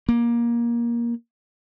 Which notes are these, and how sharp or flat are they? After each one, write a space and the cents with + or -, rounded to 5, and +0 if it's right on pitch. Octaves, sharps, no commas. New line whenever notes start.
A#3 +20